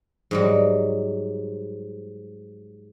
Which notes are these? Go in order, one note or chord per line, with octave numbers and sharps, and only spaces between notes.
G#2 F#3 G3